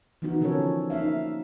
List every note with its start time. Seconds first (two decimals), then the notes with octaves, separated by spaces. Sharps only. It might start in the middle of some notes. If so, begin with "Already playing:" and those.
0.22 E3 F3 B3 D#4 F#4
0.41 D3 F3 C#4 A4 A#4 C#5
0.90 A#3 D#4 E5 F5